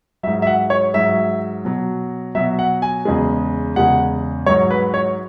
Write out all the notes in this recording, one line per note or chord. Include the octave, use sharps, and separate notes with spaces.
G#2 F#3 E5
E5
F#5
C#5
G#2 F#3 E5
B2 F#3
B2 F#3 E5
F#5
G#5
E2 C#3 G#3
E2 C#3 G#3 F#5
G#2 F#3 C#5
B4
C#5